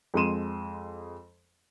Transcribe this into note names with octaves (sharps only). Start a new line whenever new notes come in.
F2 G#3 C6 D#7 E7